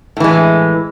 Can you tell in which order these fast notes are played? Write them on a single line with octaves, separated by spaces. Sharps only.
A2 E3 G#3